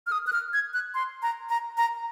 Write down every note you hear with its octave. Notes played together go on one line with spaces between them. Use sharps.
F6
D#6
F#6
F6
G#6
F#6
C6
A#5
A#5
A#5